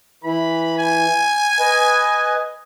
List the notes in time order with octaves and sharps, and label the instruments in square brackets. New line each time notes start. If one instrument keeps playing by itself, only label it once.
[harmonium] E3 [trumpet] B5
[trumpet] G#5
[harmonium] B4 D#5